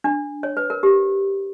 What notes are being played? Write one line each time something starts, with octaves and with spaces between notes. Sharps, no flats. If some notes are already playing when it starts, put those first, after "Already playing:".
D4
C#5
B4
A#4
G4